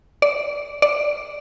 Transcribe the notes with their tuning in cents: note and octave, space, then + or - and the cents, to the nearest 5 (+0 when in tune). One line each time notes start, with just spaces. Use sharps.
D5 -15
D5 +0